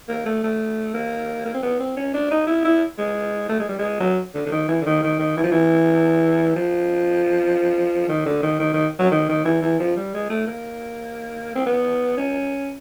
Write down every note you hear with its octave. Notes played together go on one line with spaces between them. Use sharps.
A#3
A3
A3
A#3
A#3
C4
B3
C4
C#4
D4
D#4
E4
E4
G#3
A3
G#3
G3
G#3
F#3
D3
D3
D#3
E3
D3
D#3
D#3
D#3
E3
F3
E3
F3
D#3
D3
D#3
D#3
D#3
F#3
D#3
D#3
E3
E3
F3
G3
G#3
A3
A#3
C4
B3
C#4